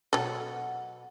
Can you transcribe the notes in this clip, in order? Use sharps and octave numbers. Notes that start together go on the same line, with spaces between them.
B2 F#3 A4 F#5